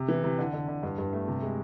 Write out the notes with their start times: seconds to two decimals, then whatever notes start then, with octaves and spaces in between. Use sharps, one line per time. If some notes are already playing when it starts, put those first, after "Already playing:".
Already playing: C3
0.08 E3
0.24 C3
0.38 D3
0.53 D3
0.68 D3
0.83 G2
0.98 G2
1.13 A3
1.28 C3
1.42 G#3